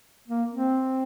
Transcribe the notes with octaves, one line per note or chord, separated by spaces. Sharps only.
A#3
C4